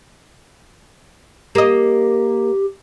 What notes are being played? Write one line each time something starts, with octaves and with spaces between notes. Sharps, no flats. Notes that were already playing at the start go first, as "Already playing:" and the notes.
A#3 G4 D#5